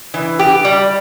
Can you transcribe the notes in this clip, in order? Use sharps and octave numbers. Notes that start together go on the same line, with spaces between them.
E3
G4
G3